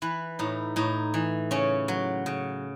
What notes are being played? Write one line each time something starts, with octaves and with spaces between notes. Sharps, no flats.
E3 B4
A2 D#4
A2 D#4
E3
C#3 C#4
F#3
C#3